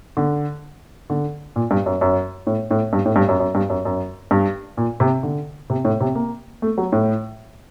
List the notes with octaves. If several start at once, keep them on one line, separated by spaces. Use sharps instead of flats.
D3
D3
A#2
G2
F#2
F#2
A2
A2
G2
A2
G2
F#2
F#2
G2
F#2
F#2
G2
A#2
C3
D3
C3
A2
C3
A#3
A3
F#3
A2